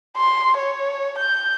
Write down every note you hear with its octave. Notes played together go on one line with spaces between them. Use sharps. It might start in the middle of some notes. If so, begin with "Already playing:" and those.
C6
C#5
G6